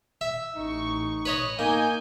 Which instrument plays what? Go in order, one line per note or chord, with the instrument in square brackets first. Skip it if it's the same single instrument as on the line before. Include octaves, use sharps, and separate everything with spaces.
[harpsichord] E5
[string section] A1 C#6 [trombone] D#4
[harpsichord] B4 C#5 D#5
[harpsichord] A#3 [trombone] D#4 [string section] G#5 G6